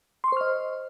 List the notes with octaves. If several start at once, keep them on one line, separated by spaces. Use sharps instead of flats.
C5 D#5 C6 C#6 F6